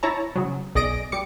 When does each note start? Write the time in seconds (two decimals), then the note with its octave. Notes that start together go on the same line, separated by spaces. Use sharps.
0.03 E4 C#5 A5 A#5
0.36 C#3 F#3
0.75 B1 G#4 D5 D#5 A#6 D7
1.12 G3 D6 C#7